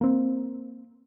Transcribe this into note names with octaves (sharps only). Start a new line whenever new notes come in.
A#3 C4